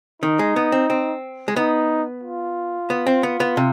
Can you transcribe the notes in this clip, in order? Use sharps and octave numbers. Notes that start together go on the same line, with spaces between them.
D#3 D#4
G#3
B3
C4
C4
G#3
B3 D#4
F4
B3
C4
B3
B3
C3